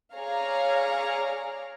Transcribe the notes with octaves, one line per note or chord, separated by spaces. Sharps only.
G#4 C#5 D5 F5 A#5